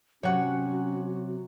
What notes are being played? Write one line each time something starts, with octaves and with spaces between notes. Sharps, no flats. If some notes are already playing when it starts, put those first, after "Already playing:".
C3 F#3 C#4 F#4 C#5 F#5